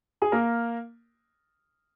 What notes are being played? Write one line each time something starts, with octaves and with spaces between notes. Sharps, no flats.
G#4
A#3 A#4